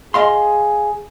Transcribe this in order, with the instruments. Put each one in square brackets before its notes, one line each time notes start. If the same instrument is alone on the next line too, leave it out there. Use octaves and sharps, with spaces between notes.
[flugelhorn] G#4 [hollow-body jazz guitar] D#5 F5 C6